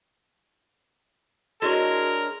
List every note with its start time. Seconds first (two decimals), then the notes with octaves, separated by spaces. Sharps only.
1.62 G#3 D4 E4 F#4 A#4 C#5